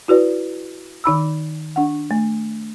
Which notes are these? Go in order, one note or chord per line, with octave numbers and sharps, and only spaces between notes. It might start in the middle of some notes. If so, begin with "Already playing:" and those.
E4 F#4 B4 D5
D#3 D#4 B5 E6
D4 F#5
A3